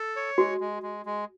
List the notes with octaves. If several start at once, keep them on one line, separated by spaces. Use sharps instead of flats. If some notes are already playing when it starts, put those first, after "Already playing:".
Already playing: A4
C#5
G#3 F#4
G#3
G#3
G#3